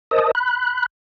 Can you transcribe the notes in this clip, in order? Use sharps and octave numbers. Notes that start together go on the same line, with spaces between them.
A#4 C5 D#5 A5 D#6
B5 F#6